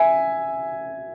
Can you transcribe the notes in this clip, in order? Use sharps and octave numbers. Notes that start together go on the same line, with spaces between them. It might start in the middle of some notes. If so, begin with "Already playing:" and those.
Already playing: E5 G#5